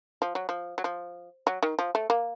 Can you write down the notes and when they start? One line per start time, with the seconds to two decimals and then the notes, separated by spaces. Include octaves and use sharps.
0.22 F3
0.35 F#3
0.49 F3
0.78 F#3
0.84 F3
1.47 F#3
1.63 D#3
1.79 F3
1.95 A3
2.10 A#3